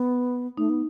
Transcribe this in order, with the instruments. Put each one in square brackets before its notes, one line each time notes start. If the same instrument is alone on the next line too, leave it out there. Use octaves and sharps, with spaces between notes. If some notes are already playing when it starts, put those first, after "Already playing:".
Already playing: [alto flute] B3
[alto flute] A3 [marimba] D#4
[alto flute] B3